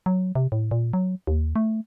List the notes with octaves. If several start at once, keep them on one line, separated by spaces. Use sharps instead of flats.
F#3
C3
A2
A#2
F#3
D#2
A3